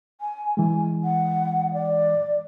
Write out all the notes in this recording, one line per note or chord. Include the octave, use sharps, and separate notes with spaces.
G#5
E3 G#3 G#5
F#5
D5